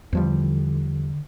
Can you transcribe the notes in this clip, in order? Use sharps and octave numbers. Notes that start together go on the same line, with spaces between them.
E2 D3 F3 G3